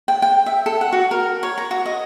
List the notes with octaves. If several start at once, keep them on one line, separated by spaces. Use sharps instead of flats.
G5
G5
E5
A4
F#5
F#4
A#4
C#5
A#5
F#4
D#5